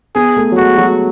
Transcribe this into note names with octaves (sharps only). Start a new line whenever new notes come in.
B3 G#4
A3
F#3
G#3 F#4
F#3